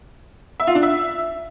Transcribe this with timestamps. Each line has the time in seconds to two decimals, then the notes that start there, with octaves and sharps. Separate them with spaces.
0.60 E5
0.67 F4
0.75 D4
0.83 E5